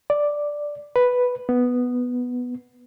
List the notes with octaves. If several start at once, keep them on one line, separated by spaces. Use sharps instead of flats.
D5
B4
B3